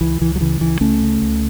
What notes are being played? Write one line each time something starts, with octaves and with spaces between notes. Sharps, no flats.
C#2 E3
C#2 E3
F#3
C#3 E3
C#2 E3
C#2 A3 C#4
C#3
C#2